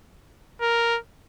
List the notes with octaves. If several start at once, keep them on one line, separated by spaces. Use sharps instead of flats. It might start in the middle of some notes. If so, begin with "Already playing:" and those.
A#4